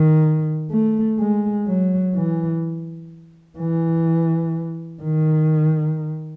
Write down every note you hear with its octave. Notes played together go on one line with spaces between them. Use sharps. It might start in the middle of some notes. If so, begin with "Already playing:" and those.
Already playing: D#3
A3
G#3
F#3
E3
E3
D#3